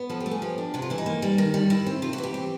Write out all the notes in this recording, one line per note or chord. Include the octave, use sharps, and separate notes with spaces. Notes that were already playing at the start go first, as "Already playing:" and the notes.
Already playing: B3
F3 A4
G4
A3
G#4
F3 G4
D4
C3 F#4
F4
E3 E4
D#4
A#3
G3
D#3
G3
D#3 E4
C4
C3 F4
F#4
E3
G4
C4